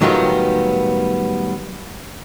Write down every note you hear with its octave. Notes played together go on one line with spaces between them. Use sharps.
A2 D#3 F#3 G3 B3 F4